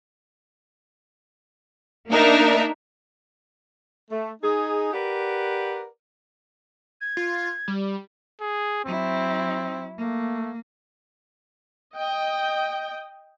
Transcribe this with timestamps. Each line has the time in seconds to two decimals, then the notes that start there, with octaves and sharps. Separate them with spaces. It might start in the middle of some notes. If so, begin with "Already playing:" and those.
2.12 A#3 D4 D#4 A#4 E5
4.11 A3
4.42 D#4 G#4
4.93 G4 A#4 B4 D5 F#5
7.01 G#6
7.17 F4
7.68 G3
8.41 G#4
8.85 F#3 C4 E4
9.98 A3 A#3
11.95 D#5 G5